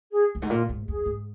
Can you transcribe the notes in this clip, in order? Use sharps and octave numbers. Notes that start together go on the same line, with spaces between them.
G#4
F2
G#2
A#2 F4
G#2
F2 G#4
G#2